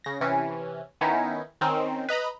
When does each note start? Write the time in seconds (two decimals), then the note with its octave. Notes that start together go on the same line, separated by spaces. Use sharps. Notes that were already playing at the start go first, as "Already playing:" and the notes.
0.04 C#3 A#6
0.21 C3 E3 C#4
1.01 D#3 B3 C#4 D#4 E4
1.61 D#3 C4 C#4 D#4
2.09 B4 D#5 A#5 B5